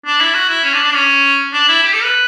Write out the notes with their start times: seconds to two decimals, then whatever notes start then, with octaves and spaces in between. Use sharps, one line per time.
0.06 D4
0.20 E4
0.34 F#4
0.49 E4
0.64 C#4
0.74 D4
0.84 D4
0.94 C#4
1.53 D4
1.68 E4
1.83 G4
1.93 A4
2.04 B4